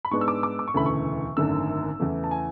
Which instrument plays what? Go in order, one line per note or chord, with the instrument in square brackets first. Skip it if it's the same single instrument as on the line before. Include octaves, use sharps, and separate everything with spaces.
[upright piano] B5
G#2 G#3 B3 D4 C#6
E6
D6
D6
D6
C#6
E1 D2 C#3 E3 A3 B5
C#6
G#1 F#2 D3 A3 E6
E2 C#3 E3 A3
A5
G#5